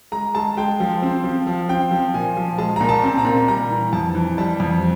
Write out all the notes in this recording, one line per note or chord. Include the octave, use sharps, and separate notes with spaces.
G#3 A#5
G#3 A5
G#3 G5
F3
C4
F3
F3
C4 G5
F3
A#2 G#5
F3
G#3 A5
A#2 A#5
A5
C4
A#5
A#2
G3 A#5
E3
F2 A5
E3
G3 A5
F2